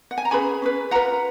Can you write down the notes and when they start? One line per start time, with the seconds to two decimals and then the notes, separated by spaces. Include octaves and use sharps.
0.11 F#5
0.18 G#5
0.25 A#5
0.31 C#4 G#4 B4 G#5 B5
0.62 C#4 G#4 B4
0.91 F4 B4 F#5 A#5